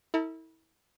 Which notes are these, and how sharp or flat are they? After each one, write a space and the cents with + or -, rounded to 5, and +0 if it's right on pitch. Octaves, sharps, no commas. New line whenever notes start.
E4 -30 A4 +45